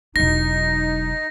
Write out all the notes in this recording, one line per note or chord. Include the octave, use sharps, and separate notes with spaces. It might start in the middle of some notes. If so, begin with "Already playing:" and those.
E1 F#3 D#4 A#6